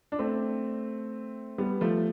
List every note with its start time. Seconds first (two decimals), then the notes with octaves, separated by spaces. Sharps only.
0.12 D4
0.19 A3 C4
1.58 G3 B3
1.81 F3 A3